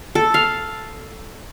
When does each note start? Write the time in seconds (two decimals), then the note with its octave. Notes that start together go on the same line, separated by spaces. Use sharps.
0.15 A4
0.34 F5